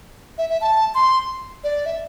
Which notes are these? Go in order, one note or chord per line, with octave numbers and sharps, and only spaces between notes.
E5
E5
A5
C6
D5
E5